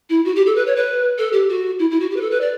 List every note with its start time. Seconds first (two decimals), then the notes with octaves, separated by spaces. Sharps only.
0.10 E4
0.25 F#4
0.36 G4
0.46 A4
0.56 B4
0.66 C#5
0.76 B4
1.18 A4
1.33 G4
1.49 F#4
1.79 E4
1.91 E4
2.00 F#4
2.11 G4
2.16 B4
2.21 A4
2.31 B4
2.41 D5